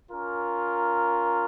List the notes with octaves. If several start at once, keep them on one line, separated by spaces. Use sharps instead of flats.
C#4 F4 A#4